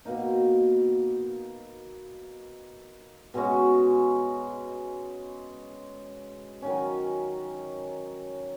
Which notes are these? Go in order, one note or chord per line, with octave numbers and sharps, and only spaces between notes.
B2 A#3 D#4
B2 G#3 C#4 F#4
D#3 F#3 C#4